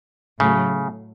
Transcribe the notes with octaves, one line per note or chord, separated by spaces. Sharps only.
A2 C#3 F#3 A3